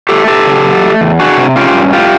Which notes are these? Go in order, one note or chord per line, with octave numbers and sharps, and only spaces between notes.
A3 G4 A4
A2 G4 A4
C#3
F#3
A3
E2
D4 F#4 G#4
C3
C#4 F4 G4
G2
A2 F4 G4